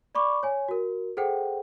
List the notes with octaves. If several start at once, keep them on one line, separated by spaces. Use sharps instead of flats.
D5 B5 C#6 D6
C#5 G#5
F#4 A#4
G#4 A4 C5 F#5 G5